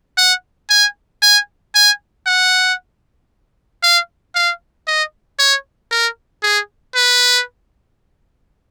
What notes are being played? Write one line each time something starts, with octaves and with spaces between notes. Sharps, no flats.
F#5
G#5
G#5
G#5
F#5
F5
F5
D#5
C#5
A#4
G#4
B4